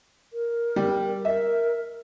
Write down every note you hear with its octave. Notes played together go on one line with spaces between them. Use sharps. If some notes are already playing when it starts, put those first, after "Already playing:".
A#4
G3
A#4 E5